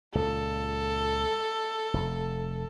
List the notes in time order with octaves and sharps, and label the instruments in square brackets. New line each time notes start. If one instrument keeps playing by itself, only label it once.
[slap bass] C#2 A#2 [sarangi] A4
[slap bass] F1